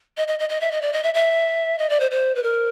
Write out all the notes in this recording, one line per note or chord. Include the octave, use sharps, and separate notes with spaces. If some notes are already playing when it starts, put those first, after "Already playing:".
D#5
D#5
D#5
D#5
E5
D#5
D5
D#5
E5
E5
D#5
D5
C5
C5
B4
A#4